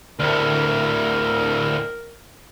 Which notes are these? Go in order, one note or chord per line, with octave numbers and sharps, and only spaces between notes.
D2 A2 A#4